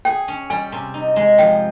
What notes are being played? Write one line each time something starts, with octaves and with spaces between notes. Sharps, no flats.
G#4 G5
C#4
G3 G#5
C3
D#4
G#3
F3 G5